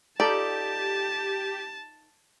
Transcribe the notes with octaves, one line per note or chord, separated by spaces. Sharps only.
D#4 F4 G4 A4 D5 A5